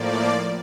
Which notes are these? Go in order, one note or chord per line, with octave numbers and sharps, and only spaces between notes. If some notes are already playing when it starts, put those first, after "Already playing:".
Already playing: A2 F3 A#3 D5